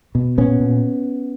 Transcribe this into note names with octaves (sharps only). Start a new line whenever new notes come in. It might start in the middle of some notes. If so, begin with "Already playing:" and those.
B2
A#2 B3 C#4
A#2